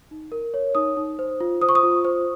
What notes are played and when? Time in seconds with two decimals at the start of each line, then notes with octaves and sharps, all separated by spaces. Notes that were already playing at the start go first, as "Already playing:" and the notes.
0.11 D#4
0.32 A#4
0.54 C#5
0.75 D#4 D#6
0.97 D#4
1.19 C5
1.40 F4
1.62 C5 D#6
1.69 C#6
1.75 D#6
1.83 F4
2.05 C5